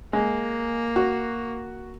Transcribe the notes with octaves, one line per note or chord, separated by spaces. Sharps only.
G#3 A#3
F#4